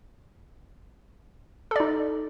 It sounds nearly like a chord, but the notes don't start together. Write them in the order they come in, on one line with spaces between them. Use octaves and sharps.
A4 D5 D#4